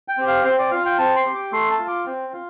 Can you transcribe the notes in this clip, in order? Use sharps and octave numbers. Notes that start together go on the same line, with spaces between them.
G5
C4 G4
F5
C4 C5
D5
F4 F5
G5
C4 A5
C6
G4
D6
A3 C6
A5
F4
D6
C4
F4